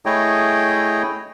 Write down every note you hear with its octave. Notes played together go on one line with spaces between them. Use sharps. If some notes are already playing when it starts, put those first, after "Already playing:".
A3 E4 G#4 C#5 D#5 G5